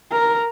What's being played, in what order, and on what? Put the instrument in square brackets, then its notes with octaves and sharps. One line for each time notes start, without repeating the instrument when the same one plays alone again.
[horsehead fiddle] A#4